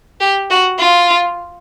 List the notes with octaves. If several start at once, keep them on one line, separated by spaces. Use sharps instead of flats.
G4
F#4
F4